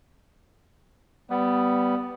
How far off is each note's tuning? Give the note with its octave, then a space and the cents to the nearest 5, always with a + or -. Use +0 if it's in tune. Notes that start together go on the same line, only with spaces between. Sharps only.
G3 -10 B3 +5